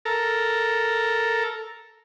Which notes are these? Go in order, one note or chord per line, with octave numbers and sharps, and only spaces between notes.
A4 A#4